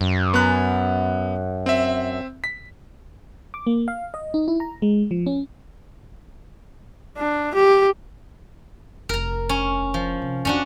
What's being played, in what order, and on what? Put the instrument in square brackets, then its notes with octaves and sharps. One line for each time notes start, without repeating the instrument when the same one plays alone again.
[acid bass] F#2
[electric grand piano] B3 F#6
C4 E5
B6
[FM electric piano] D6
A#3
F5
D#5
D#4
E4
A#5
G#3
F3
C#4
[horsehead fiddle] D4
G4
[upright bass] F1 [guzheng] A#4 A#5
[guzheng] C#4
F3
[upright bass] C3
[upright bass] F2 [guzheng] C#4 D4 F#4